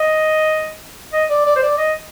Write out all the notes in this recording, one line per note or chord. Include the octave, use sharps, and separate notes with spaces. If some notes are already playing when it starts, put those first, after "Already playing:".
Already playing: D#5
D#5
D5
D5
C5
D5
D#5